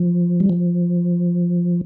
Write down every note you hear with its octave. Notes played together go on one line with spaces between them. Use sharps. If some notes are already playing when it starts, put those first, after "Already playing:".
Already playing: F3
G3
F3